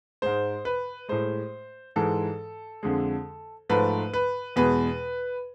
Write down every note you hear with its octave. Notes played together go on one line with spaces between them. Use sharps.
G#2 G#3 C5
B4
A2 G#3 C5
G#2 E3 G#3 A4
F2 D3 G#3
G#2 F3 A3 B4
B4
E2 B2 G#3 B4